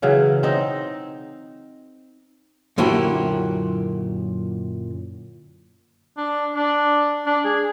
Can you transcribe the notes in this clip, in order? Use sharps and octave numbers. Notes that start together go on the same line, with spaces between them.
C#3 E3 F#3
C4 D#4
F#2 A#2 D3 E4 F#4 G4
D4
D4
D4
G#4